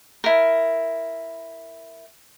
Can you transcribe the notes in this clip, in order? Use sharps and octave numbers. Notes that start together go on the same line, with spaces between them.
E4 A#4